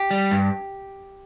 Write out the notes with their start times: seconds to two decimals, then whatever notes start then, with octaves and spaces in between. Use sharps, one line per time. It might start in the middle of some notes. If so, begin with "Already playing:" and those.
Already playing: G4
0.11 G3
0.31 G2